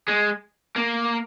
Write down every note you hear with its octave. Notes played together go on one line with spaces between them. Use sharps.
G#3
A#3